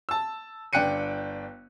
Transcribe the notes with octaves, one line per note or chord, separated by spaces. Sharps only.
A5 E6
G1 D4 G5 F#6 C#7 D#7